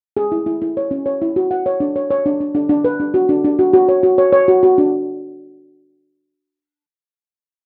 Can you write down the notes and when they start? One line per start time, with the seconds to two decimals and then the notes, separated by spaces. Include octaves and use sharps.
0.17 G#4
0.32 E4
0.46 E4
0.62 E4
0.77 C#5
0.91 C#4
1.06 C#5
1.22 E4
1.36 F#4
1.51 F#5
1.66 C#5
1.80 D4
1.96 C#5
2.11 C#5
2.26 D4
2.41 D4
2.55 D4
2.69 D4
2.84 B4
3.00 D4
3.14 F#4
3.29 D4
3.44 D4
3.59 F#4
3.73 F#4
3.89 C#5
4.03 F#4
4.18 C#5
4.33 C#5
4.48 F#4
4.63 F#4
4.78 D4